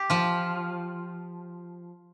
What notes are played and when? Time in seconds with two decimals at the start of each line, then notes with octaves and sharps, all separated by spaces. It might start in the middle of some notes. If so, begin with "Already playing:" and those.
Already playing: G4
0.10 F3 F4